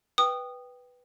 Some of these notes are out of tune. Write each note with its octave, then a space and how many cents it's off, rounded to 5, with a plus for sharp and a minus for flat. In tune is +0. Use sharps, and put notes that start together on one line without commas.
B4 +0 G5 +0 D#6 -20